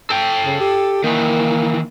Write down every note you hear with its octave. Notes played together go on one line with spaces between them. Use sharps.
A4 G5
C#3
G4
D#3 E3 A#3